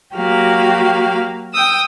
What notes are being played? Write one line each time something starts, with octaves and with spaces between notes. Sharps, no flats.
F#3 A#3 F#4 G4 F5
G5 D#6 E6